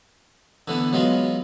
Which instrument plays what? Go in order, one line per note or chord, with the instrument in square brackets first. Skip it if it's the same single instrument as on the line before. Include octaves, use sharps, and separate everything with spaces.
[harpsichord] D3 E3 B3
F#3 G#3 B3 F4